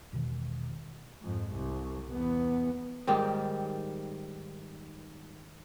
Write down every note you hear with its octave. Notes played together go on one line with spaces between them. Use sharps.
E1 B2 D#3
F2 G#2
C2
E2 B3
G#2 D#3 G3 G4